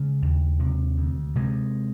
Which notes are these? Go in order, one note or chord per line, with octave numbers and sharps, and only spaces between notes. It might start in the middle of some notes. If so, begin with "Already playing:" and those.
Already playing: C#3 G#3
D#2
C3
D2
C3 G#3